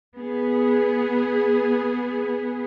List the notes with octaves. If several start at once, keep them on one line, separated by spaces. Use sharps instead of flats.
B3 G#4